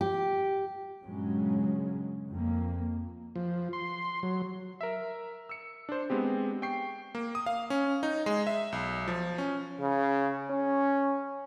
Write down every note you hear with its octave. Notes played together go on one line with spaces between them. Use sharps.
G4
G2 A#2 C#3 F#3 G#3 C#4
F2 A#3
F3
C6
F#3
A#4 E5
E6 C#7
D4 C5
G#3 B3 C4 G4
G5 C#6 C7
A#3
D#6
F5
C#4
D#4
G#3
E5
B1
F3
C#4
C#3
C#4